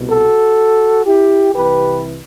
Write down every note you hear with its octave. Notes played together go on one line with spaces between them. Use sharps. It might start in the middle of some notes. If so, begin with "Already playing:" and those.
Already playing: C2 B2
F#4 A4
E4 G4
C2 C3 E3 G4 B4